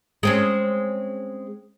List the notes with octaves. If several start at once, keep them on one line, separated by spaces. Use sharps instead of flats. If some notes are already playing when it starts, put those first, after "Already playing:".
G#3 C4 C#4